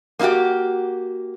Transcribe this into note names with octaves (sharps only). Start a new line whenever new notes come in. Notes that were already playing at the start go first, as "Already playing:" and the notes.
A#3 D#4 E4 F#4 G4